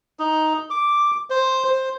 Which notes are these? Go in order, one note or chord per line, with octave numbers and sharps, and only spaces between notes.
D#4
D6
C5
C5